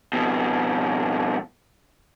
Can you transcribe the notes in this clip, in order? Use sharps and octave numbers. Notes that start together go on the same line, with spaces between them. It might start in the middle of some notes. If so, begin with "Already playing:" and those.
F2 B2